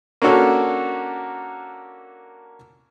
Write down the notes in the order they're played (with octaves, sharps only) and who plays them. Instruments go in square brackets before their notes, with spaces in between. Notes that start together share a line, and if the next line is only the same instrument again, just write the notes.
[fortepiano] A#3 C#4 D4 F#4 A4